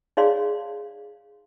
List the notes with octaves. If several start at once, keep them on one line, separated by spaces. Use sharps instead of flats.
D#4 G#4 C#5 D5 F5 C6